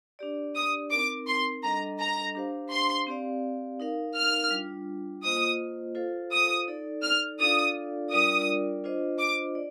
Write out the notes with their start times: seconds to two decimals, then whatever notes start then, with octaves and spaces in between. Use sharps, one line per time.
0.19 D4 G4 D5
0.55 D#6
0.91 C4 D#4 A#4 D6
1.27 C6
1.63 G3 D4 A4 D#5 A#5
1.99 A#5
2.35 D4 G4 C5 F5
2.71 C6
3.07 C4 G4 D5 F5
3.80 D#4 A#4 F5
4.15 F6
4.51 G3 D4 F4
5.23 A#3 F4 C5 D#5 D#6
5.95 F4 A4 C5 F5
6.32 D#6
6.68 D#4 A4 D5
7.03 F6
7.40 D4 F4 A4 D5 F5 D#6
8.11 G3 D4 F4 A#4 D5 D#6
8.84 D4 F4 C5 D#5
9.19 D6
9.55 D5